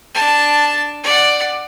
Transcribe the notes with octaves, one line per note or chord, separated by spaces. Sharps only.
D4 A5
D5 F#5